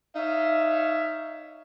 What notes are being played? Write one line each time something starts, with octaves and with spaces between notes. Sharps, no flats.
D#4 C#5 E5 F5